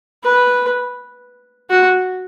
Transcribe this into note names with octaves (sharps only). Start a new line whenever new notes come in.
B4
F#4